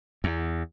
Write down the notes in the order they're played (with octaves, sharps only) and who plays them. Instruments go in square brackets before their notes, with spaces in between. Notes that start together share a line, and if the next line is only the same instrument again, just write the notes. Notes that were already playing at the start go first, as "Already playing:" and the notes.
[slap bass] E2